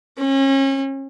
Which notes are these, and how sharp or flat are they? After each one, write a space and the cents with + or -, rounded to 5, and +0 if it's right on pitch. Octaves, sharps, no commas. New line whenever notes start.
C#4 -35